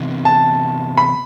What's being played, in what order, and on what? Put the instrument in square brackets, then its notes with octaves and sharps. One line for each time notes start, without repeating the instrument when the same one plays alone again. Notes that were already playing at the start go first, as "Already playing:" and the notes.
Already playing: [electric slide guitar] C3 E3 B3 E4
[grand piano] A5
B5